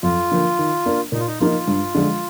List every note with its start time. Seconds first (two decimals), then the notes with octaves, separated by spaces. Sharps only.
0.03 F2 F4
0.31 D3 F3 A#3
0.59 D#3
0.86 A#3 D4
1.12 A#2 D#4
1.19 F4
1.27 D#4
1.40 F3 A#3 D#4 F4
1.68 G2
1.95 D3 F3 G#3